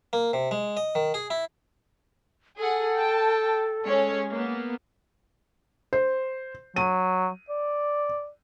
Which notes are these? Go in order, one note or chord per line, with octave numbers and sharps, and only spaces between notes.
A#3
C3
G#3
D#5
D#3
G#4
E4
G#4 A4 F#5
G5 A5
G#3 C#4 C#5
A#3 B3
C5
F#3 D#7
D5